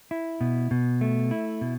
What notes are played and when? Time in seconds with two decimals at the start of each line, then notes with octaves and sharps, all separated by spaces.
0.11 E4
0.41 B2
0.71 B2
1.01 A3
1.31 E4
1.61 B2